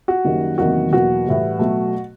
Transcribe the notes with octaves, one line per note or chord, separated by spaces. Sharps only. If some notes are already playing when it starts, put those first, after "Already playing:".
F#4
F#2 D#3 G3 A#3
E2 C3 D#3 F#3 A#3 F#4
E2 B2 F#3 A#3 F#4
A2 E3 G3
B2 F#3 A3